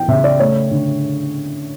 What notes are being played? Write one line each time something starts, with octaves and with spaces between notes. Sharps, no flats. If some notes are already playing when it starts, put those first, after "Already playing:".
Already playing: E3 G5
C#3 E5
D5
A3 C#5
D3